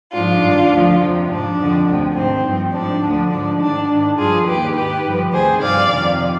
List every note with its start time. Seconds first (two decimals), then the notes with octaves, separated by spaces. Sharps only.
0.13 G#2 F3 D4 F4
0.42 G2 D#3
0.71 D2 D3 F3
1.00 F2 C3 F3
1.29 G#2 F3 D4
1.58 F2 D3 F3
1.86 D2 C3 F3
2.15 G#2 D#3 C4
2.44 G2 F3
2.73 G#2 F3 D4
3.03 D2 D3 F3
3.31 G#2 F3 D4
3.59 G#2 D#3 D4
3.88 G#2 D#3
4.17 G2 F3 F4 G#4
4.46 D#2 D#3 G4 B4
4.75 G#2 D#3 G4 B4
5.04 G2 D3 F3
5.33 D2 C3 D#3 G#4 C5
5.62 G2 F3 D5 F5
5.90 F2 C3 D#3